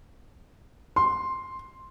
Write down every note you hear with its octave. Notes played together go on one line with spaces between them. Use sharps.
C6